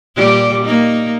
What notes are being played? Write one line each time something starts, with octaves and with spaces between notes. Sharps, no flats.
A#2 G3 G4
A#3 D#4